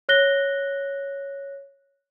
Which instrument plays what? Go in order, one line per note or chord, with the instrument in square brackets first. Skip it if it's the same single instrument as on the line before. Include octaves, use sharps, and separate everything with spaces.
[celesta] C#5 F#6 A#6 G7